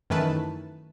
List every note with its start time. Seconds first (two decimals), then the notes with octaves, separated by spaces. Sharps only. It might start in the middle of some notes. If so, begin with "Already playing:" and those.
0.10 F#2 D#3 E3 A3 B4 A5